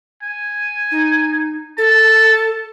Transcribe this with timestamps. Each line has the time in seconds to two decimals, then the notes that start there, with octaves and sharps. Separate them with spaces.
0.23 G#5
0.91 D#4
1.78 A4 A5